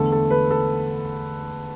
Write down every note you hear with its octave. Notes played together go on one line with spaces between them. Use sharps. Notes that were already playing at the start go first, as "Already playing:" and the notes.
Already playing: E2 D3 A3 A4
A4
B4
A4